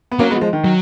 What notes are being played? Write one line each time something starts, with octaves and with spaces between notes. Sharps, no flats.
B3
F#3 A#3 C#4
G#3 B3
F3 G#3
D#3
F#3